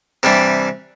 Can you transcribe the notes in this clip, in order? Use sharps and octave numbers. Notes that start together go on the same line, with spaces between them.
C3 E3 G3 D4